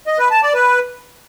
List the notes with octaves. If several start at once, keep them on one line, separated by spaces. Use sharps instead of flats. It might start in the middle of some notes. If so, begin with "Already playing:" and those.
D#5
B4
A5
D5
B4